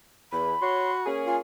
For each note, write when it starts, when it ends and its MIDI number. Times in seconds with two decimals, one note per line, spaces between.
0.32 0.55 40
0.32 1.03 83
0.62 1.09 66
0.62 0.92 73
0.62 0.92 84
1.06 1.39 58
1.06 1.39 61
1.06 1.39 68
1.27 1.39 65
1.27 1.36 80